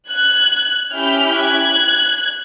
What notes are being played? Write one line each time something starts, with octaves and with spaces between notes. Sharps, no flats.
F#6 G#6
C#4 E4 G4 F6 G6
F#6 G#6